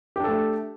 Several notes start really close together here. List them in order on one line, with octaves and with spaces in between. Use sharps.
G4 D4 A4 A3